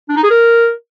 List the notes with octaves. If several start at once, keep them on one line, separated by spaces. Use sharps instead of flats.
D4
D#4
G#4
A#4